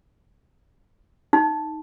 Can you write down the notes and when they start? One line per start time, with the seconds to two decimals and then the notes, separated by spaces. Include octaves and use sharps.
1.33 D#4